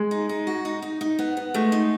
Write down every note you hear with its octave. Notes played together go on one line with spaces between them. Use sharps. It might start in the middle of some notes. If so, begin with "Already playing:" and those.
Already playing: G#3
D#4
D#4
F#4
D#4
D#4
D#4
B3
B3
G#3 A3
D#4